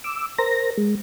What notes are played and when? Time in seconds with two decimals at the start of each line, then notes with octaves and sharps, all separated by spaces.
0.04 D6 E6
0.39 A#4 C5 A#5 A#6
0.78 G#3